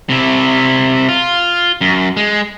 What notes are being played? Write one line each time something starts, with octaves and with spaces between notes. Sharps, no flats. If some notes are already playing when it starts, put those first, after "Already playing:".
C3 E4
F4
F#2
G#3